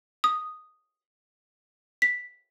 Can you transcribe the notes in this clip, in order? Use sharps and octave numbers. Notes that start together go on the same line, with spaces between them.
D#6
B6